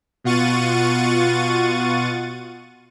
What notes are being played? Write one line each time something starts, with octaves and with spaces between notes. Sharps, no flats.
B2 F4 F#5 C#6 A6 D#7